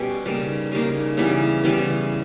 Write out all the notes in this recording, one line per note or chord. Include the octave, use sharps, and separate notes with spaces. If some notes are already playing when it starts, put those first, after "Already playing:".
Already playing: B2 G3 C#4 G4
C#3 G3 A#3 D#4
C#3 G3 A#3 D#4
C#3 E3 G3 B3
C#3 E3 G3 B3